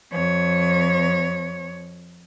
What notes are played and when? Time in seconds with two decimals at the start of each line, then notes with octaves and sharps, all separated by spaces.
0.12 F2 C#5